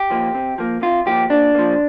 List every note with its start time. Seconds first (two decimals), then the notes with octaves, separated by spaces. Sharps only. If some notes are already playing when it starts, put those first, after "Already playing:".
Already playing: G4
0.10 F3 A#3
0.35 C3
0.58 F3 A#3
0.82 C3 F4
1.06 F3 A#3 G4
1.30 A#2 D4
1.55 F3 A#3